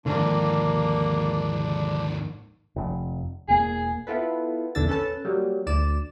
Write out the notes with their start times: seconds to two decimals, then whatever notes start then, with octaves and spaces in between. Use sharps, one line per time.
0.06 D#2 G#2 D3 D#3 F3 A#3 D4
2.76 F1 F2
3.48 E1 A#3 G#4
4.07 B3 E4 F4 A4 B4
4.75 A#1 E2 D3 D4 E6 A6
4.88 C#4 A4 B4 A5
5.25 F#3 G3 A#3
5.66 D2 D5 E7